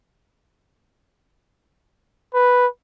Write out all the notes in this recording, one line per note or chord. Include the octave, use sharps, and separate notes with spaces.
B4